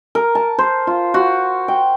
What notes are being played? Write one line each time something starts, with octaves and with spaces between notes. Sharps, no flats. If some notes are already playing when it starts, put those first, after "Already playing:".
A#4
A5
C5
F4
F#4
G5